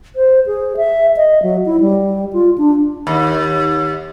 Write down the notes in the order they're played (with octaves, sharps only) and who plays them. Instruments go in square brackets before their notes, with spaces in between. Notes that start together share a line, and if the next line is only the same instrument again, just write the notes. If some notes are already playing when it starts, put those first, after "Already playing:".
[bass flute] C5
G#4
E5
D#5
F#3
E4
G3
F4
D4
[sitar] D#2